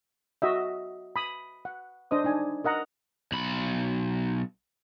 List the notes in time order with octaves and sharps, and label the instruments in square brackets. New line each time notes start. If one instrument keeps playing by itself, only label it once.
[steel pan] F#4 D#5 E5
B5 D#6
F#5
D4 C5 D#5 D#6
D4 D#4 G#5
A#4 D#5 F#5 A#5
[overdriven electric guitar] B1 B5